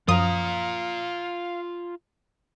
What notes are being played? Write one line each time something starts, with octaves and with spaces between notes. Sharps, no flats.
F#2 F3 F4 F5 A#5 D#6